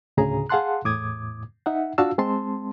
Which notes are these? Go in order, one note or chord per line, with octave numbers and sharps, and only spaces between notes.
D2 A2 C#3 G#4 A#5
G#4 F5 F#5 A5 C6 F#6
E2 A2 D6 D#6 G#6
D#4 E5 F#5
D4 F4 F#4 F5 A5 E6
G#3 C4 A5 C6